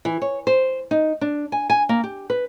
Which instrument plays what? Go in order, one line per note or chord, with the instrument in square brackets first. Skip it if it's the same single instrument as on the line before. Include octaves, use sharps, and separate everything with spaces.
[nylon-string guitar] E3
C#5
C5
D#4
D4
G#5
G#5
A#3
G4
B4